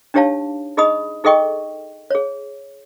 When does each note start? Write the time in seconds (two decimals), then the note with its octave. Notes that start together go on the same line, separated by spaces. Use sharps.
0.14 D4 D#4 G4 C#5 F5 A5
0.77 D#4 G#4 D#5 B5 D#6
1.24 D#4 G#4 A4 D#5 G5 C#6
2.10 G#4 C#5